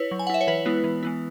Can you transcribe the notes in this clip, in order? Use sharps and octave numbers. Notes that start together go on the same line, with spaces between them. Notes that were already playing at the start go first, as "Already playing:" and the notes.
Already playing: E4 B4 C#5
F#3
G#5
F#5
E4 E5
C#5
E3 B4
G#3 B3 E4
E3
G#3 B3 E4